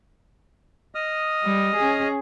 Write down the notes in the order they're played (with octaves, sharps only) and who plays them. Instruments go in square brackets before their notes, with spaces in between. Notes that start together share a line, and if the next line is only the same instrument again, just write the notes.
[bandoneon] D#5 D#6 F6
[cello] G3
C#4 G#4